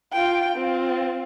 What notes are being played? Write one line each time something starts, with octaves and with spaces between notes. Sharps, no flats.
F4 G5
C4 F4